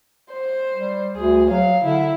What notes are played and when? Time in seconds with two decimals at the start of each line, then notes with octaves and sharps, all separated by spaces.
0.32 C5
0.74 G3
1.17 D2 G#4
1.50 F#3 F5
1.84 D3 E4